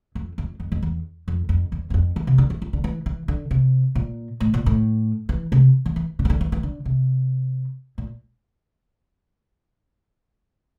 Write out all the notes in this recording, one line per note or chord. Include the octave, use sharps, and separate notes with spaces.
F2
F2
F2
F2
E2
F2
F2
E2
G2
F2
E3
C3
D3
E3
F3
D3
E3
E3
D3
C3
A#2
A2
A#2
A2
E3
C3
E3
E3
D3
E3
D3
E3
E3
D3
C3
A#2